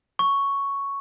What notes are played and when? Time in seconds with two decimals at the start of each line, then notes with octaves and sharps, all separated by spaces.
0.19 C#6